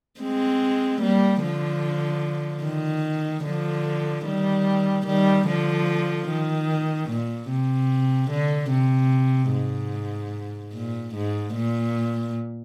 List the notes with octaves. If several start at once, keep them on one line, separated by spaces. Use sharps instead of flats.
G#3 C4
G3 A#3
D3 F3
D#3
D3 F3
D#3 G3
D#3 G3
D3 F3
D#3
A#2
C3
D3
C3
G#2
A#2
G#2
A#2